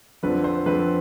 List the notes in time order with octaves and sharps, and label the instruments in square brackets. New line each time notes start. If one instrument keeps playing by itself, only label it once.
[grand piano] F2 D3 F3 C4 B4
C5
F2 D3 F3 C4 B4